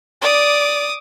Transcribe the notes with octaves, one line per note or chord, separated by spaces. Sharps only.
D5 D6 D#6